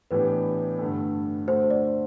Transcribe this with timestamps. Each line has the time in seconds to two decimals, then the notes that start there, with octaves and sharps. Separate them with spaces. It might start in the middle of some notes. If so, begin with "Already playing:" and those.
0.11 A2 E3 B3 D4 G4 B4
0.79 G2 D3 A3
1.47 D2 D3 A3 C5
1.70 D5